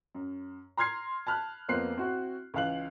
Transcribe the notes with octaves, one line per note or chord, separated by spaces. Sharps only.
F#2
A#5 C6 F6 G#6 C7
A5 B5 F6 F#6
F2 A#3 B3 C5 F#6 C7
C4 E4 F#4
C#2 E3 F5 F#6 F#7